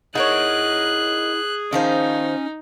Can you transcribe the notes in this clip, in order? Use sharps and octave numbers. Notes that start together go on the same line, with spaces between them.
D#4 E4 G#4 A#4 C#5 F#5 F#6
D#3 F3 C#4 D#4 C5